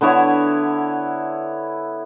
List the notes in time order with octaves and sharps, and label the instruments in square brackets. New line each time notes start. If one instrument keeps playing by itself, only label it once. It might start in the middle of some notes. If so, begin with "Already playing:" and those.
[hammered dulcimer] D3 B3 E4 C#5